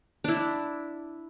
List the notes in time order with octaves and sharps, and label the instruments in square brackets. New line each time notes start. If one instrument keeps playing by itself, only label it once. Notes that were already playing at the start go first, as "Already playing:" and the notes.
[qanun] D4 E4